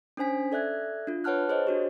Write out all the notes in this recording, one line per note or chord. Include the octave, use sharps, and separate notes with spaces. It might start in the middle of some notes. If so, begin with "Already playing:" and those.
C#4 D4 C5 G#5 B6
A4 D5 E5 F#6 G#6
D4 F4
B4 C#5 F#5 A5 F6 F#6
G#4 C5 C#5 D#5
D4 F#4 G4